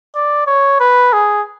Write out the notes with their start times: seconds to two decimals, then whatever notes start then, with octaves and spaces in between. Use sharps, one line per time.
0.16 D5
0.47 C#5
0.80 B4
1.13 G#4